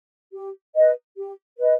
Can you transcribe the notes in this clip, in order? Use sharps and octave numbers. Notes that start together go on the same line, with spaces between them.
G4
B4 D#5
G4
B4 D#5